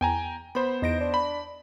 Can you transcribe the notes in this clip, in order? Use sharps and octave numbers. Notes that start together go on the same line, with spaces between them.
E2 G5 G#5 A#5
B3 C5 B5
E2 D#4 A#6 D7
D4
B5